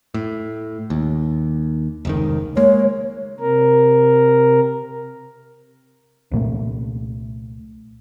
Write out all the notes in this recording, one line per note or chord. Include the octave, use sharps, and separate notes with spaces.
A2
D#2
F1 C#2 D#3
G#3 A#3 C#5
C3 A#4
C2 A#2 A3